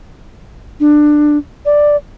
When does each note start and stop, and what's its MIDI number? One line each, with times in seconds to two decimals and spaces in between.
0.80 1.38 62
1.65 1.96 74